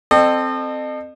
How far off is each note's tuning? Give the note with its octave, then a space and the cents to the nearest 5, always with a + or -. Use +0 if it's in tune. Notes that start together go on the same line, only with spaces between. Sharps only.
C4 +0 A4 +0 D#5 -40